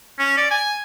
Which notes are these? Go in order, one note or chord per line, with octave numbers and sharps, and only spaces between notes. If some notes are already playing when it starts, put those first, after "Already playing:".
C#4
D5
G#5